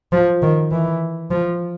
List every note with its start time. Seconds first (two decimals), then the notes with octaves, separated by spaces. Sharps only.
0.12 F3
0.42 D#3
0.72 E3
1.31 F3